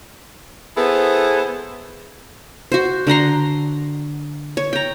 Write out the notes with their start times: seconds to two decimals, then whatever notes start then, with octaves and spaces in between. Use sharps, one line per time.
0.77 B3 E4 G#4 A4 B4 C5
2.72 F#4 C5
3.07 D3 F#5 A#5 C6
4.57 C#5
4.73 G5 A#5